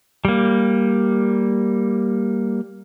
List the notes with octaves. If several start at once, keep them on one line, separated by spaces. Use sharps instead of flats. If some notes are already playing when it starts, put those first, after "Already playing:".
G3 A#3